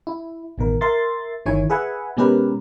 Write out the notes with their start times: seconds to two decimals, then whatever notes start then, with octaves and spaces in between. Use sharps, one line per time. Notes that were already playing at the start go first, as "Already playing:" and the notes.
0.07 E4
0.58 A1 B2 D#3 A#4
0.81 A#4 E5 C6 A6
1.46 G1 D#3 E4 C#5 G#5
1.70 G#4 B4 E5 F#5 G#5
2.17 B2 G#3 C#4 G4 A#4 B4